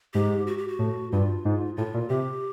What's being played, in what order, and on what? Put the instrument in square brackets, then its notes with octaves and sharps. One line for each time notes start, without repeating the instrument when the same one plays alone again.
[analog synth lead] G#2 [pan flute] G4
[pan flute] F#4
G4
F#4
[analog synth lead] A2
[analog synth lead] G2 [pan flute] F4
[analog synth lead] G#2
[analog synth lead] A2 [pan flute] F4
[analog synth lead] A#2
[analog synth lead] C3 [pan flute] G4